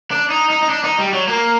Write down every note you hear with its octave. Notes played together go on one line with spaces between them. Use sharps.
D4
D#4
D#4
D#4
D4
D#4
G3
F#3
A#3